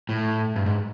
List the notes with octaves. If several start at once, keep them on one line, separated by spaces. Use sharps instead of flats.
A2
G2
G#2